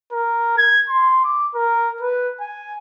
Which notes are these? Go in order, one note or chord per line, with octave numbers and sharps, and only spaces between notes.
A#4
G#6
C6
D6
A#4
B4
G#5